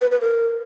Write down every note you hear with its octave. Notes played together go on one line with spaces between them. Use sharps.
B4
B4
A#4